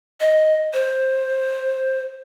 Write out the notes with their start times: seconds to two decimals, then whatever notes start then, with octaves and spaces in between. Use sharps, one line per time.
0.21 D#5
0.73 C5